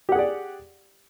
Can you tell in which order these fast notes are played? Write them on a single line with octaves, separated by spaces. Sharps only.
G4 F#5 G#4 D5